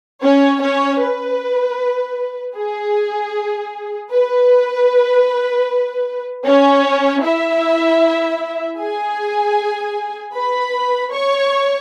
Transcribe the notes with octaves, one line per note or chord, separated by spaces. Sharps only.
C#4 C#5
C#4 C#5
B4
G#4
B4
C#4 C#5
E4 E5
G#4 G#5
B4 B5
C#5 C#6